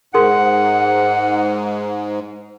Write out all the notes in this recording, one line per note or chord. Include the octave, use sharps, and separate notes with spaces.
G#2 G#4 A#4 F#5 C6